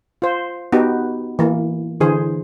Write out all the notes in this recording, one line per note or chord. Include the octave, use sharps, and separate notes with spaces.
F4 C5
B3 D#4 F#4 G4
E3 A#3
D3 E3 G#4 C5